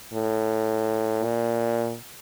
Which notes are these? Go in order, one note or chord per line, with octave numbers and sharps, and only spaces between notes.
A2
A#2